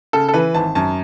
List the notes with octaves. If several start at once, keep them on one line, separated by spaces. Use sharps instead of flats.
C#3 A4
A4
E3 B4
G#1 A5
F#2 A5